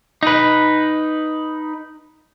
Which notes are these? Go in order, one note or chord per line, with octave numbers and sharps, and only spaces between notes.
D#4 B4